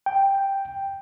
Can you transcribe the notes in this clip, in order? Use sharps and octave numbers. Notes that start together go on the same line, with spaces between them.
G5